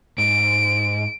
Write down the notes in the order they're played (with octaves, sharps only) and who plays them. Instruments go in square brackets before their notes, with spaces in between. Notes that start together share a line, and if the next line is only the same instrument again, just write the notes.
[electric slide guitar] G#2 [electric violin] D7